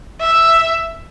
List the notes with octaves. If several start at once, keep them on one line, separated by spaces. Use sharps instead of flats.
E5